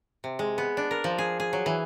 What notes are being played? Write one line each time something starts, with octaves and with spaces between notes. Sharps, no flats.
C3
G#3
B3
D4
A#4
F3
G#4
G#4
F#3
E3